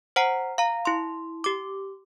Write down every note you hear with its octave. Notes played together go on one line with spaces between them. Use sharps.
C5 F#5 A#5 C7
F5 A#5
E4 C6
G4 D6